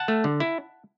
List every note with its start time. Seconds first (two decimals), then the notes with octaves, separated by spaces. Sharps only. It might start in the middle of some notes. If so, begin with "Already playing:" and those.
Already playing: F#5 A5
0.08 A3
0.24 D3
0.40 E4